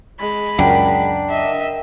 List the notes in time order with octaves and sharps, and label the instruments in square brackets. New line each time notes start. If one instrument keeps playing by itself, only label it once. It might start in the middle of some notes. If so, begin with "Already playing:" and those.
[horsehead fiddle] G#3 B5
[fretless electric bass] C#2 F#2 [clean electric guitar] D4 [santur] A#4 F#5 G5
[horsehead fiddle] D#5 E5